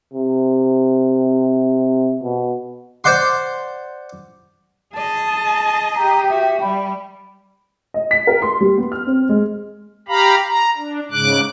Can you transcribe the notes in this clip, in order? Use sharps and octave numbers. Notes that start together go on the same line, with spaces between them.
C3
B2
C5 D5 F#5 C6
G#4 D#5 A5
G4 A#5
F#4 E5
G3 B5
D#5
B6
A#4
C6
G3
B3
F6
C4
G#3
G4 F5 A#5 B5
A#5
D4
G#2 C#3 D6 F#6